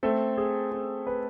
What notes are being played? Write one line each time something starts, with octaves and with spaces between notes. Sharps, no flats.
A3 C4 A4
G#4
C4
B4